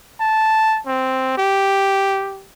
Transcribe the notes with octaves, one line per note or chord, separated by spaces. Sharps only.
A5
C4
G4